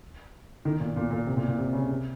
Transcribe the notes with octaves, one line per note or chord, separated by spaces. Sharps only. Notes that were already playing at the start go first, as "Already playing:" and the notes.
D#3
A#2
A#2
A#2
C3
A#2
A#2
C3
C#3
C3